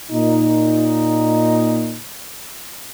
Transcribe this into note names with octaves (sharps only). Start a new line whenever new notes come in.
A#2 D#4